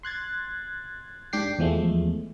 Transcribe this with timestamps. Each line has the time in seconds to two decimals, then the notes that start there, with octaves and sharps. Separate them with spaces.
0.03 C6 F#6 G#6 A6
1.33 G#2 D4 G4 G5 C7
1.59 E2 F3 G#3 A3